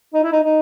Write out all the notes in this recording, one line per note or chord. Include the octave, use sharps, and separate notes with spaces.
D#4
E4
D#4
D#4